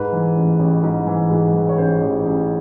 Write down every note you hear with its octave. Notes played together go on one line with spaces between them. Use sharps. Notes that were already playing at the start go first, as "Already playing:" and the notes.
Already playing: G#2 B4
E3
A1
A1
G#2
E3
G#2
E3
C#5
A1 C5
A1
A1